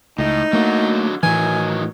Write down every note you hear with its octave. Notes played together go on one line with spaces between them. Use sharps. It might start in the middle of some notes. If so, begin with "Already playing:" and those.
C#2 A2 D#4
D3 F#3 A3 A#3 F#4
A2 D#3 E3 F#3 G#5